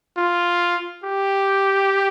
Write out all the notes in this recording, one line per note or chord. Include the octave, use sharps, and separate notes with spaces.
F4
G4